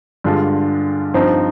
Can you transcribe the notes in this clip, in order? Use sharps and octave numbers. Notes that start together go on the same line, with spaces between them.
G2 D3 G#3 D4 F4
G2 F3 C4 D#4